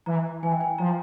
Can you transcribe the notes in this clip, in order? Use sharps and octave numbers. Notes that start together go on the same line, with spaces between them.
E3 A#5
E3 G#5
G5
G#5
F3 A#5